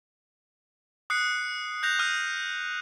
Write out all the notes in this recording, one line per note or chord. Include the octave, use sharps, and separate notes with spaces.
D#6 F#6 C7 C#7
F#6 G6 A#6 F7
D#6 F6 D#7